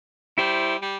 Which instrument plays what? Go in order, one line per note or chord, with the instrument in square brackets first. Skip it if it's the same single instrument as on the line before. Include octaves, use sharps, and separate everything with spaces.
[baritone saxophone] G3 [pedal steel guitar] E4 C5
[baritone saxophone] G3